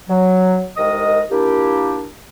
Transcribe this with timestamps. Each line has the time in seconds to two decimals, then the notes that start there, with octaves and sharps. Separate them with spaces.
0.09 F#3
0.77 C2 D#3 G#3 A#4 D#5 D#6
1.30 A#2 A#3 D4 E4 G4